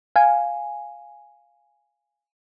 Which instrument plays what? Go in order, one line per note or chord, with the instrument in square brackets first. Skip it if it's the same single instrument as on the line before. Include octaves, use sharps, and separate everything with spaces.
[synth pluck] F5 G#5